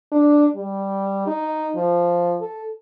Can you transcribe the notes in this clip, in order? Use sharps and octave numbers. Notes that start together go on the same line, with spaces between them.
D4
G3
D#4
F3
A4